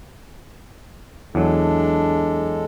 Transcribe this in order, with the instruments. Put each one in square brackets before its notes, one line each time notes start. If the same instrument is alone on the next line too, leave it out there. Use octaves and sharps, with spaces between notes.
[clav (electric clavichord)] E2 F#3 [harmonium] G#3 A4 [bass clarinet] D4